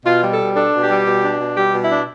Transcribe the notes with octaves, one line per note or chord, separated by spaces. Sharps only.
B2 F4
G3
A4
B2
D4 A4
B2
G4
G3
B2
D4
B2
G3 G4
B2
E4
D4